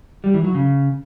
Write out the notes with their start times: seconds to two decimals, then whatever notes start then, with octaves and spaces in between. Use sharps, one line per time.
0.24 G3
0.34 E3
0.44 F#3
0.55 C#3